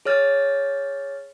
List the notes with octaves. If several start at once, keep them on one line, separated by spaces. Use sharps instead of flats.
G#4 C#5 F6 A6